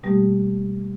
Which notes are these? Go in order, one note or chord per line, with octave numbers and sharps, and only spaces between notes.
B2 G3 A3 A#3 G4